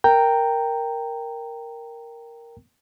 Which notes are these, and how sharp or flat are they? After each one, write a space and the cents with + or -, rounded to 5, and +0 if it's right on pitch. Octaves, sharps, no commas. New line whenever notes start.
A#4 +0 G5 +0 A#5 -15